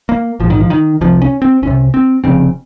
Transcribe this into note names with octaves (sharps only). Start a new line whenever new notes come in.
A#3
A#1 G#2 F3
D#3
F3
D#3
C2 C3 F3
C#4
C4
C2 C3 C#4
C4
F1 F2 C#3 C4